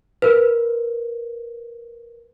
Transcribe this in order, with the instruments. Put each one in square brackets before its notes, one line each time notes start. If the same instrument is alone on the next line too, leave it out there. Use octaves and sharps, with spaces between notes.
[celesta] A#4 B4